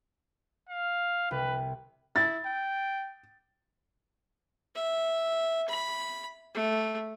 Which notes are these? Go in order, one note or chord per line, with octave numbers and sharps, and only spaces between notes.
F5
C2 B4
E4 A6
G5
E5
B5
A3